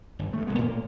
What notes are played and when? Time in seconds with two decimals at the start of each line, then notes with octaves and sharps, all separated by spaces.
0.19 G1
0.33 G2 A3
0.47 D1 G2 G#3 B3
0.58 A2 A3 A#3